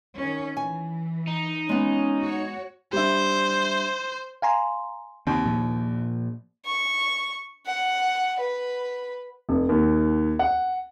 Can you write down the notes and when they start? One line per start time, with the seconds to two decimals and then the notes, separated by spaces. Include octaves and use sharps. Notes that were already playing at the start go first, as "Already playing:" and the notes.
0.17 D#3 C#4
0.57 E3 G#5
1.27 D#4
1.69 G#3 B3 C#4
2.20 F#4 C#5
2.93 G3 D4 C5 E5
4.42 F5 G#5 A#5 C6
5.27 D#2 C4
5.45 A#2 F3
6.66 C#6
7.67 F#5
8.40 B4
9.49 F1
9.69 D#2
10.39 F#5